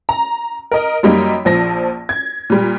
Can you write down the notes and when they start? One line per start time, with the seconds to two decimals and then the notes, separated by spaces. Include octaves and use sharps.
0.09 A#5
0.71 A#4 D#5
1.03 F#2 G3 A#3 D#4
1.45 A#1 F3 A#6
2.09 G#6
2.50 A#2 G3